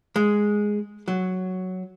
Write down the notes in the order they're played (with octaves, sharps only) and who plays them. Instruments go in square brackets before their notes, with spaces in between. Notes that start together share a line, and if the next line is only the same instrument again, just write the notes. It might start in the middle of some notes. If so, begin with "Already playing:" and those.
[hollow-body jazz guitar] G#3
F#3